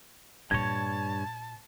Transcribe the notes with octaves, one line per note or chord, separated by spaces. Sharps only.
G2 A#2 A#3 C#5 A5 G#6